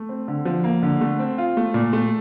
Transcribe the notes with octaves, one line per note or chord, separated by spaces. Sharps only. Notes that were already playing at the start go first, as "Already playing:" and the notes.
Already playing: A3
C4
D3
F3
A#3
D3
A3
C4
F4
A3
A#2
A3